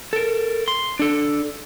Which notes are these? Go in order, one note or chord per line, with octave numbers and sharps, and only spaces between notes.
A4 A#4
C6
D4 A4